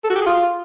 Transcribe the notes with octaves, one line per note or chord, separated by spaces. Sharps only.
A4
F#4
G4
G#4
F4